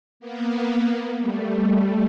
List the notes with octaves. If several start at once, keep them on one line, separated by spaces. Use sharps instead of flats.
A#3 B3
G3 A3